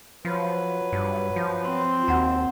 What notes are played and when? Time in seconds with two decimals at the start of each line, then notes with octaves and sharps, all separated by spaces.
0.25 F3 F#3 F4 B4
0.93 G2
1.36 F3
1.65 C4 C6
2.08 D#2 F#4 F#5 A#5